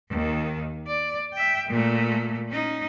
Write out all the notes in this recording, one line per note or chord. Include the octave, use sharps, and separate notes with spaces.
D#2 D#3
D5
E5 G5
A#2 A3
C#4 D#4